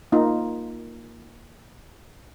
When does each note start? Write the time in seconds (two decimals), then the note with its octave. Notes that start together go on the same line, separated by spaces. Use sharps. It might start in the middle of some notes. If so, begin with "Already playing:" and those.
0.12 A#3 D#4 F4